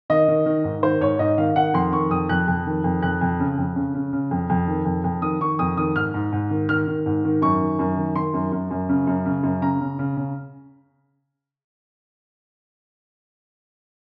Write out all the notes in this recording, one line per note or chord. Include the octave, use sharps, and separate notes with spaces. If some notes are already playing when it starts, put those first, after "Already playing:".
D#3 D#5
D#3
D#3
G#2
D#3 C5
G#2 C#5
G#2 D#5
D#3 F5
D#3 F#5
F2 C6
D#3 C#6
F2 D#6
F2 F#6
F2
D#3
F2
F2 F#6
F2
C#3
F2
C#3
C#3
C#3
F2
F2
D#3
F2
F2
D#3 D#6
D#3 C#6
F2 D#6
D#3 D#6
G#2 F6
G#2
G#2
D#3
D#3 F6
D#3
G#2
D#3
F#2 C#6
D#3
F#2
D#3
D#3 C6
F#2
F#2
F#2
C#3
F#2
C#3
F#2
C#3 A#5
C#3
C#3
C#3